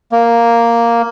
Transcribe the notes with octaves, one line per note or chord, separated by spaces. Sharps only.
A#3